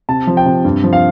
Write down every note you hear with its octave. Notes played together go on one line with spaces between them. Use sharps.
C3 A5
F3
G5
C3
G2
F3
F5